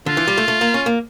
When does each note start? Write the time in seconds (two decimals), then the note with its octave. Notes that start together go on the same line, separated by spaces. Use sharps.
0.06 D3 F4
0.17 E3
0.28 G3
0.37 A3
0.48 A3
0.61 A#3
0.74 C#4
0.86 A#3